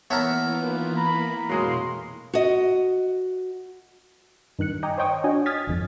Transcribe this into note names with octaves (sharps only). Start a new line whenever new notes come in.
E3 A#3 B3 A#4 C#5 E5 A5
D#4 F4 B4
A#5 B5
F2 B2 F#3 G#3 A#3 E4 F5 C6
F#4 D#5
G2 D#3 F#6 C#7
D#5 G5 G#5 A#5 D6
C5 C#5 D#5 G5 C#6 D#6
D4 F#4 C#5 D#5 G#5
D#6 F6 G#6 A6 B6
G#1 F2